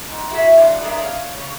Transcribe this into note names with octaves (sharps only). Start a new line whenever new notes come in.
G#2
E4 F#4 G#4 E5
A2 E3 F#3 C#4 D4 F4
G#3 D4 G#4 A#4 D5 E5
C#5 F5
C#3 C#5